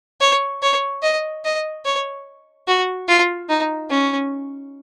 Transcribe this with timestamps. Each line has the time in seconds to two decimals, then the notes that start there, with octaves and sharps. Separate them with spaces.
0.21 C#5
0.62 C#5
1.03 D#5
1.45 D#5
1.85 C#5
2.68 F#4
3.08 F4
3.49 D#4
3.90 C#4